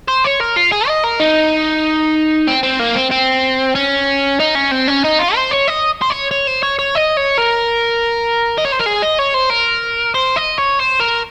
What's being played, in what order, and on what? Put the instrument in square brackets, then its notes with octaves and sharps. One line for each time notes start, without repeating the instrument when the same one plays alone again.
[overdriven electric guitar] C5
C#5
A#4
F4
G#4
D#5
A#4
D#4
C4
C4
A#3
C4
C4
C#4
D#4
C#4
C4
C#4
D#4
F4
C5
C#5
D#5
C5
C#5
C#5
C5
C#5
C#5
D#5
C#5
A#4
D#5
C#5
C5
A#4
G#4
D#5
C#5
C5
A#4
C5
D#5
C#5
C5
A#4